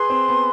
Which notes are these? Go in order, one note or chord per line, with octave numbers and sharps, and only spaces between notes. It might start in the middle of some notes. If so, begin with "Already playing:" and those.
Already playing: G#4 B4 C6
C4
B3